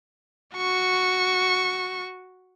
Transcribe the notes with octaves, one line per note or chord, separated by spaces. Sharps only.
F#4 C#6